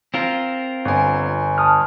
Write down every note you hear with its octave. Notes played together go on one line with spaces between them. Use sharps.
C4 F4 A#4
G1 G#5
A5 D#6 F6